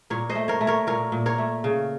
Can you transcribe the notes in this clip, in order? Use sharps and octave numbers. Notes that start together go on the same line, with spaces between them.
A#2 A#4 C#5
C5 D#5
A3
A#4 C#5
A3
A#4 C#5
A#2 A#4 C#5
A#2
A#4 C#5
A3
C#3